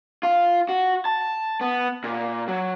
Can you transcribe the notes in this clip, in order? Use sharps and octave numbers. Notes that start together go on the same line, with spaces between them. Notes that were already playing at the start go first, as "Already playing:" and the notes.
F4
F#4
A5
B3
A#2
F#3